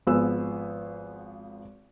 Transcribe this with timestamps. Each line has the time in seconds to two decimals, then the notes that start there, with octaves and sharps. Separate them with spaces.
0.07 G#1 F3 B3 G#4 B4 E6